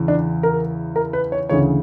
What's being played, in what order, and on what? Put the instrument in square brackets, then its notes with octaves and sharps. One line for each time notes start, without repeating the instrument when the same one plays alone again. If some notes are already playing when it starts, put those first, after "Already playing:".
Already playing: [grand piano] E2 C#3 E3
D4
A#4
A#4
B4
C#5
D2 C#3 E3 C#5